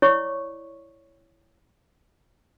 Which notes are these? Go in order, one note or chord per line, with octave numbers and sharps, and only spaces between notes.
E4 C#5 D5 C#6 D6